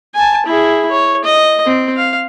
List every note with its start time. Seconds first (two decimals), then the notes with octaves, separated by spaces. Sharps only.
0.15 G#5 A5
0.46 E4 G#4
0.91 C#5
1.24 D#5
1.66 C4
1.97 F5